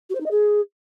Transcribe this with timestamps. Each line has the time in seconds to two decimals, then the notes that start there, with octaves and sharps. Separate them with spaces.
0.10 F#4
0.15 C5
0.20 D#4
0.26 D#5
0.31 G#4